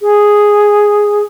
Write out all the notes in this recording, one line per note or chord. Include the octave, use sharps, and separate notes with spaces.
G#4